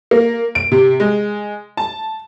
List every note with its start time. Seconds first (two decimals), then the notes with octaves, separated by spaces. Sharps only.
0.11 A#3
0.55 D7
0.72 C3
1.00 G#3
1.77 A5